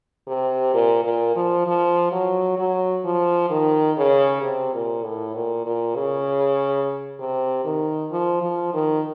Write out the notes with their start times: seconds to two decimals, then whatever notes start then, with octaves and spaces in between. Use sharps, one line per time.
0.28 C3
0.74 A#2
1.05 A#2
1.36 F3
1.67 F3
2.12 F#3
2.58 F#3
3.05 F3
3.50 D#3
3.97 C#3
4.42 C3
4.73 A#2
5.04 A2
5.35 A#2
5.66 A#2
5.96 C#3
7.19 C3
7.65 D#3
8.11 F3
8.41 F3
8.73 D#3